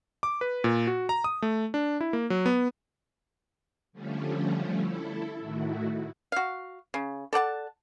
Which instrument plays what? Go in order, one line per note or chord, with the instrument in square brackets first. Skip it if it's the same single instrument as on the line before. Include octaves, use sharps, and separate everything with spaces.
[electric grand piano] D6
B4
A#2
F#4
A#5
D#6
A3
D4
E4
A#3
F#3
B3
[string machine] D3 F3 G3 A3 C#4
E4 A4
A2 D#3 A3 E4 F#4
[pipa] F#4 F5
C#3
A4 D5 F#5 A5